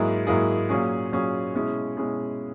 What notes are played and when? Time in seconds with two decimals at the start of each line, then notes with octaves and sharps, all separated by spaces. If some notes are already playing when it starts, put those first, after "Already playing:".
Already playing: G#2 F#3 A#3 E4 G#4
0.26 G#2 F#3 A#3 E4 G#4
0.69 A#2 F#3 C#4 G#4
1.12 A#2 F#3 C#4 G#4
1.54 B2 G#3 C#4 E4 G#4
1.97 B2 G#3 C#4 E4 G#4